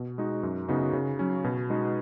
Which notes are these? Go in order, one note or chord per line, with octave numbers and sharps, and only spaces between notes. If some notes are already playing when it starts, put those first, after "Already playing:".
Already playing: B2
G#3 D#4 F#4
F#2
C#3 B3 D#4 F#4
C#3
F#3 C#4
B2
G#3 D#4 F#4